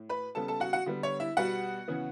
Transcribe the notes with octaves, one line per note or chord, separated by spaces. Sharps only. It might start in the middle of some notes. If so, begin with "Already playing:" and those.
Already playing: A2
B4 B5
C#3 G3 B3 A4 A5
A4 A5
F#4 F#5
F#4 F#5
D3 G3 B3
C#5
E4 E5
B2 G3 B3 F#4 F#5
C#3 E3 B3